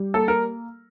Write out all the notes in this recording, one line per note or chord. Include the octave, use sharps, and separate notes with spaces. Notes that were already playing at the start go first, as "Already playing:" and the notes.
Already playing: G3
A#3 A4
A#4